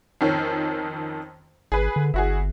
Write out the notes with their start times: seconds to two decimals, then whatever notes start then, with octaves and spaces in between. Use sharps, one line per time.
0.21 F2 D#3 C#4
1.72 G#1 G#4 B4
1.96 D3
2.14 G1 E4 F#4 G#4